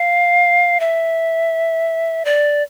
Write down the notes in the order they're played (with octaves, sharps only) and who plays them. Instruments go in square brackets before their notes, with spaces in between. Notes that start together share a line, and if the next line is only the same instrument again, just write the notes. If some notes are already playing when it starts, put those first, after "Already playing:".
Already playing: [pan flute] F5
E5
D5